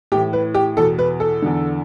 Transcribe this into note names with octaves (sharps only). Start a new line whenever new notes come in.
A2 E3 G4
B4
G4
E2 B2 A4
B4
A4
E2 D3